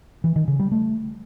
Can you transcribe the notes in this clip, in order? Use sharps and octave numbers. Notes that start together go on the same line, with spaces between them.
E3
D#3
C#3
G3
A3